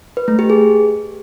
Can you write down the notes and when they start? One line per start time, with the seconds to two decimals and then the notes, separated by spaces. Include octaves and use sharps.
0.17 B4
0.28 A3
0.39 G4
0.50 G#4